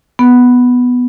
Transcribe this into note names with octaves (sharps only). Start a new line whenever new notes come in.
B3